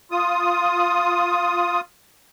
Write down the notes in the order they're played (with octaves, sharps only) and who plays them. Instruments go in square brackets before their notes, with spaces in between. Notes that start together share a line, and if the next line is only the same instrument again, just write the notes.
[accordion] F4 D#6